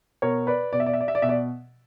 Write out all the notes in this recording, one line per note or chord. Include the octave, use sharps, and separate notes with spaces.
B2 A#4 C#5
B4 D5
B2 D5
E5
D5
E5
D5
E5
D5
B2 E5
D5